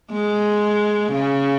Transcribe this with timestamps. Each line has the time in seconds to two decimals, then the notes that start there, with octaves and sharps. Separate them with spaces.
0.11 G#3
1.12 C#3